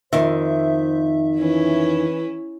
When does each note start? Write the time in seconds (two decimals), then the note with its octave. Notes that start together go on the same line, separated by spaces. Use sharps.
0.13 F2 D#3 C5 E5
1.38 E3 C#4 E4